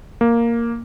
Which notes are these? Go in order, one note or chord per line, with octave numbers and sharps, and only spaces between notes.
A#3